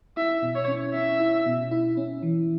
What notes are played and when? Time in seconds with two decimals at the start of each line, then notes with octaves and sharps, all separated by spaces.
0.17 E4 E5
0.42 B2
0.55 C#5
0.68 C#4
0.94 C#4 E5
1.20 E4
1.46 B2
1.71 E4
1.97 C#4
2.23 E3